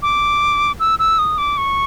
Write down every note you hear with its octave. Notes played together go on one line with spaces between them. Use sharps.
D6
E6
E6
D#6
D6
C#6